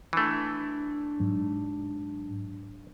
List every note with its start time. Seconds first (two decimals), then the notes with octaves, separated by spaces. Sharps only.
0.13 E3 A3 D4
1.20 G#2 F#3